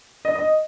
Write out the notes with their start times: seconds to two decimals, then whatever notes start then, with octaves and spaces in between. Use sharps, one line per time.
0.25 D#5
0.35 D#5